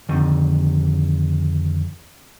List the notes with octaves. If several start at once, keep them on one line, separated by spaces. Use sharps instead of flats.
F2 D3 D#3